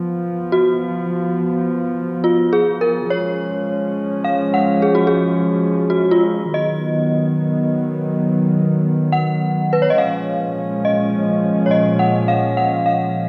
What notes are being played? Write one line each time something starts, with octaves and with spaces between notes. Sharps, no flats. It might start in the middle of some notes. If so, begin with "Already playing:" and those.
Already playing: F3 B3
F#4
F4
G#4
A#4
F3 G#3 C#4 C#5
F5
F#5
G#4
F#4
G#4
F#4
F4
D#3 F#3 B3 D#5
F#5
B4
C#5
D#5
A#2 F3 G#3 C#4 F5
D#5
C#5
D#5
F#5
F5
F#5
F5